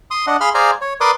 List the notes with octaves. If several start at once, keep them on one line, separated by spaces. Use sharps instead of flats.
C6 D#6
D4 D#5 F#5
G#4 F5 B5 C6 F6
G#4 C5 D5 F5 G#5 A#5
C#5
A#4 B4 D5 C6 D6 D#6